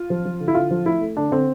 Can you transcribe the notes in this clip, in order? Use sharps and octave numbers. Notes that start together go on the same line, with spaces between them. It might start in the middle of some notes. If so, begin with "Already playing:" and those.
Already playing: F4
F3
F3
D3
E4
D3 F4
F3
A3 E4
A3
D3 D4
D3 C4